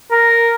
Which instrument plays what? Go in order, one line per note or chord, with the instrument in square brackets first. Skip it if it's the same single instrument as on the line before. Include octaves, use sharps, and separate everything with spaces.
[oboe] A#4